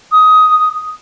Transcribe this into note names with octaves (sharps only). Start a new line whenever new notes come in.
D#6